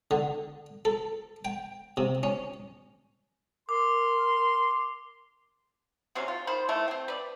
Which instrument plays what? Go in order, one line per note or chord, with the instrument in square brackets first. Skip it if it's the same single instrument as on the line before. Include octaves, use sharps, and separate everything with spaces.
[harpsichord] D3
A4
G5
C3
C#4
[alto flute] A#4 [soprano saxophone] C6 [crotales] D6
[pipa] C3 F#3 C4 C#4
F4
D#3 C5 B5
E3 A3 E4
C4 G5
B4 D5